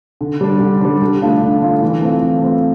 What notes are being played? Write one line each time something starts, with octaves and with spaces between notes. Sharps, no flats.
D3
G3 D4
D3
G3 D4
D3
A3 D4 F4
D3
A3 D4 F4
E3
A3 C4 F4
E3
A3 C4 F4